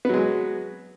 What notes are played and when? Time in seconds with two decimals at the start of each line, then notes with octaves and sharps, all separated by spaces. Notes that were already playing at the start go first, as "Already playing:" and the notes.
0.05 B3
0.09 F#3
0.14 G#3